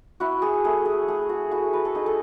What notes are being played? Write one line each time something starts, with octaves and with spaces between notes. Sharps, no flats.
E4 F#4
G#4
A3 G#4
G#4
A3 G#4
F#4
E4 F#4
B4
A4
D#4 G#4
A4